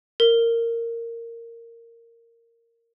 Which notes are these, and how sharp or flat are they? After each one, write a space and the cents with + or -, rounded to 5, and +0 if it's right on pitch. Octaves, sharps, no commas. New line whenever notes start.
A#4 -10